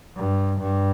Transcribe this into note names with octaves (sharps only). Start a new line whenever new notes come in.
G2
G2